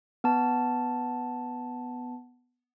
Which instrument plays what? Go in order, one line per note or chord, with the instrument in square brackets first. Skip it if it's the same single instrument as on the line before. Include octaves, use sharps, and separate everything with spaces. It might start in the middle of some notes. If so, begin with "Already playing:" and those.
[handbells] B3 A5